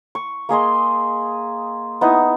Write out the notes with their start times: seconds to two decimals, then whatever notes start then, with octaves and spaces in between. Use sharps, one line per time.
0.15 C#6
0.49 A#3 G#4 D#5 C6
2.01 B3 D#4 E4